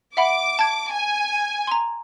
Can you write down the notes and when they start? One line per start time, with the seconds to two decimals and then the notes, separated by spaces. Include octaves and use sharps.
0.17 E5 F#5 B5 D6
0.59 A5 G#6
0.92 G#5
1.67 A#5 C6